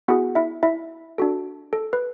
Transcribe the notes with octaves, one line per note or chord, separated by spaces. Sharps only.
B3 E4 F#4 G#4 F#5
E4 E5
E4 E5
D4 F#4 A4
A4
B4